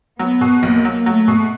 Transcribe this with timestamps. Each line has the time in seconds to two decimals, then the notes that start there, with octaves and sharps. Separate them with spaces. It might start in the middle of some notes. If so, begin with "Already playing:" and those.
0.19 F#3 B3
0.41 B2
0.62 B1 A#3
0.85 F#3
1.06 F#3 A3
1.28 B2